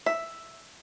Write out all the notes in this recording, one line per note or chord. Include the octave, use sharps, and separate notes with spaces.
E5